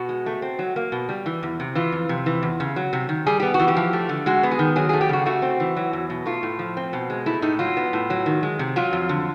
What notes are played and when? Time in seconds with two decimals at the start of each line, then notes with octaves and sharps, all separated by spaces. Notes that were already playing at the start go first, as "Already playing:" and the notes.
Already playing: B2 F#4
0.09 G#3
0.26 A3
0.42 C4
0.59 F#3
0.76 A#3
0.92 B2
1.09 G3
1.26 E3
1.43 E2
1.60 C3
1.75 E3 F4
1.92 F2
2.09 C3
2.26 E3
2.43 E2
2.60 C#3
2.76 F#3
2.93 C3
3.09 D#3
3.27 G3 G#4
3.40 B3 G4
3.54 F#4
3.59 E3
3.68 G4
3.77 F3
3.93 A3
4.09 D3
4.26 G#3 F#4
4.43 B3
4.51 G#4
4.59 D#3
4.76 F#3 G#4
4.89 G#4
4.93 A3
5.01 G4
5.09 C#3 F#4
5.26 A3 F#4
5.42 C4
5.60 E3
5.77 F#3
5.93 E2
6.10 B2
6.26 A3 F4
6.43 A2
6.59 F3
6.77 C4
6.93 B2
7.10 G#3
7.26 A3 E4
7.42 A2 D#4
7.59 F#3 F4
7.77 B3
7.93 A2
8.10 F#3
8.26 D#3
8.43 G#3
8.59 C3
8.76 F#3 F4
8.93 F2
9.09 D3